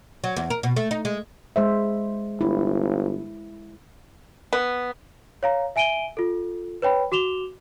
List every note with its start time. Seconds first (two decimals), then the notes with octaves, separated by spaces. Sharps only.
0.24 F#3
0.36 E2
0.50 A#4
0.63 B2
0.76 A3
0.91 D#4
1.05 G#3
1.56 G#3 C5 E5
2.41 G1 E4
4.53 B3
5.43 C#5 F5 A#5
5.76 E5 G#5 D7 D#7 G7
6.17 F4 A4
6.82 B4 C#5 G5 B5
7.12 F#4 D6 E7 F7 G7